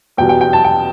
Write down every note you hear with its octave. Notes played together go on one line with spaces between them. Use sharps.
E2 B2 G3 G5
G5
G5
A5
G5